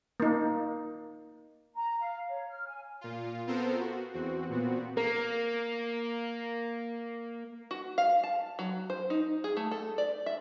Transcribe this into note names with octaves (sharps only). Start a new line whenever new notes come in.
A#3 D#4
A#5
F5
C#5
F6
G#5
A#2 F4
B3 C4 F4 A4 A#4 C5
F#4
E2 C4 F#4
A#2 B3 C4 F#4
A#3 A#4
F#4
F5
A5
F#3
C5
D#4
G#4
A3
A4
D5
E5